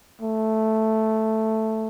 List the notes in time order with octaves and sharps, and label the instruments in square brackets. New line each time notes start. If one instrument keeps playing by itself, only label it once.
[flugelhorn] A3